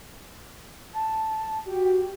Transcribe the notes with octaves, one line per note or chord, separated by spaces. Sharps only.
A5
F#4 G4 G5